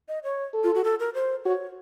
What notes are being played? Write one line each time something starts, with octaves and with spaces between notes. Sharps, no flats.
D#5
C#5
A4
F4
F#4
A4
A#4
C5
F#4 C#5